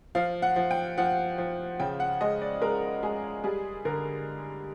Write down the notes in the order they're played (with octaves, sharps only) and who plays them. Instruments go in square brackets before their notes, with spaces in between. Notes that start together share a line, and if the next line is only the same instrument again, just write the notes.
[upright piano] F3 F5
F#5
F3
G5
F3 F#5
F3
C#3 G5
F#5
G#3 D#5
D5
G#3 A#4
G#3 G#4
G3 G#4
D3 A#4